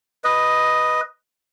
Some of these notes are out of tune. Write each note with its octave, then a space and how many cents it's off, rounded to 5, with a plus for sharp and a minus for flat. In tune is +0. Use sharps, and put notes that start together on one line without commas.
B4 +0 D#5 +0